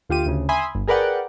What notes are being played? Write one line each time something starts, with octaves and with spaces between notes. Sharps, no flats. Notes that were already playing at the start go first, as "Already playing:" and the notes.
D2 F4 G4 D#7
D2 C#3
E5 G#5 B5 C6 D#6
G1
G#4 A#4 B4 D5 F#5 G5